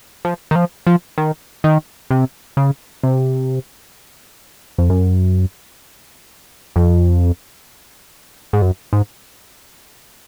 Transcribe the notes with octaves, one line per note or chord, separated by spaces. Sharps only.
F3
D#3
F3
F3
D#3
D#3
C3
C#3
C3
F2
F#2
F2
G#2
F#2
G#2